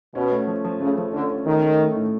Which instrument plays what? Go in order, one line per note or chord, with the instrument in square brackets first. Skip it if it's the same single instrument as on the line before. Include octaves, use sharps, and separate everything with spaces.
[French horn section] B2 [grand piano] C#4
[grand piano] A3
F3
F3
[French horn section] C#3 [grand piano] A3
[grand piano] F3
[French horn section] D3 [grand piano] C#4
[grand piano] C#4
[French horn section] D#3 [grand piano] A3
[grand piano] A3
A3
A2